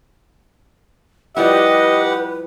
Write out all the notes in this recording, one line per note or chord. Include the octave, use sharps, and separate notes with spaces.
F3 G3 E4 G4 B4 D#5 F#5